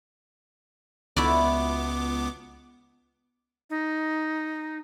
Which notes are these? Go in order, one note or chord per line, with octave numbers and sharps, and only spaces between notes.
C#2 B3 E4 F#4 D5 D6
D#4